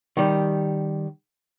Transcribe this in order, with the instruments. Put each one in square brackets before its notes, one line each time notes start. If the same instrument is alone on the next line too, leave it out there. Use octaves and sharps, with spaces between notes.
[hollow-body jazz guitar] D#3 G3